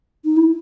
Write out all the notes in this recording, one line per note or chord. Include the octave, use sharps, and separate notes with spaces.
D#4
E4